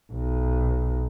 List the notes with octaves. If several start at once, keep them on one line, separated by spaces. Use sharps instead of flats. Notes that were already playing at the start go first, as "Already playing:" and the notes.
B1